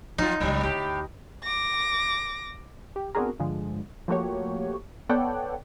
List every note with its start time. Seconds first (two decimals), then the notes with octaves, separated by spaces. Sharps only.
0.18 F3 F#3 D#4 F4
0.40 D1 C#2 A2 F#3 G3
0.63 D2 A2 G4
1.43 D6 A#6
2.96 G4
3.15 B3 C4 D4 F#4 G#4 A#4
3.39 G2 D3 F3 G#3
4.08 F3 A3 A#3 F#4 G4 C#5
5.09 B3 A4 C#5 D5 F#5 G5